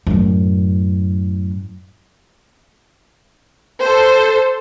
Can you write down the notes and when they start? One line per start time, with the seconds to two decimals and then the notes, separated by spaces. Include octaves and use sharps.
0.07 F#2 A2
3.83 A4 C5